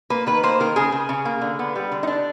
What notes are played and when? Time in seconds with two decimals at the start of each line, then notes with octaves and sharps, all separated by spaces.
0.10 A#3 B4
0.27 D#3 B4
0.43 A#3 C5
0.60 D#3 A#4
0.76 C#3 G#4
0.92 C#3
1.09 C#3
1.25 A#3
1.41 D3
1.59 B3
1.76 G3
1.92 D3
2.03 D#4
2.07 D3 D4